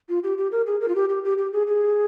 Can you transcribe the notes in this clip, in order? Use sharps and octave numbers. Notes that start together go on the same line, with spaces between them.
F4
G4
G4
A#4
G#4
A#4
F4
G4
G4
G4
G4
G#4
G#4